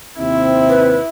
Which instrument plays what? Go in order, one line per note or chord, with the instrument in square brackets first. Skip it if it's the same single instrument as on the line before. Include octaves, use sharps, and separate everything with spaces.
[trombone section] D#2 C3 C4 [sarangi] E4
[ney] B4